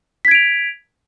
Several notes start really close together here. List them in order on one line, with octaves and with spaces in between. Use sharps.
B6 G#6 D7 F7